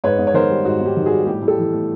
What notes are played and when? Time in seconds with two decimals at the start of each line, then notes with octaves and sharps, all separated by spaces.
0.04 G#2 B4 C#5
0.19 G#2
0.27 C#5
0.34 D#3 A#4 C5
0.50 G3
0.65 G#2 F#4
0.81 G#2
0.86 G4
0.97 D#3
1.06 F#4 G#4
1.12 G3
1.26 A2 G4
1.42 A2
1.48 G4 A4
1.58 E3
1.73 A3